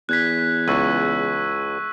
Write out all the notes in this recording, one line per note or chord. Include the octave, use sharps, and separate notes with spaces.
E2 F#6 G#6 B6
C#2 C#6 E6 D#7